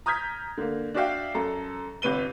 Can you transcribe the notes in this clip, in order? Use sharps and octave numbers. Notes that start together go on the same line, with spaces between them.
A#5 D#6 F6 G6 G#6 B6
D3 A#3
D4 F#4 D5 E5 F5 G5
F#2 A4 A#5
G1 C3 B4 D#7 G7